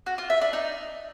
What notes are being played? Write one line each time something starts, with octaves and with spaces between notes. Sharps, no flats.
F#4
F4
E5
D4
D#4